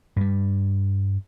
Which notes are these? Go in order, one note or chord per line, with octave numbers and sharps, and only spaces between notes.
G2 G3